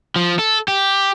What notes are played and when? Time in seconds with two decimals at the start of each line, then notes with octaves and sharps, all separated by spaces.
0.16 F3
0.39 A4
0.68 G4